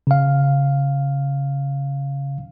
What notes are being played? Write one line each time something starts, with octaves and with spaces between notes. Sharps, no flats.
C#3 F5